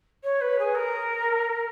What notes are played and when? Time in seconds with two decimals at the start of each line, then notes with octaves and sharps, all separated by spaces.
0.24 C#5
0.41 B4
0.59 G#4
0.75 A#4